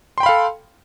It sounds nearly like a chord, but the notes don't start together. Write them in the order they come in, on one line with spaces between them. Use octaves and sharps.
C6 G5 B5 F5 A4